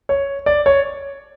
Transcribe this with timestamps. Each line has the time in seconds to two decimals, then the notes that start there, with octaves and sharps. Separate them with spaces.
0.09 C#5
0.46 D5
0.66 C#5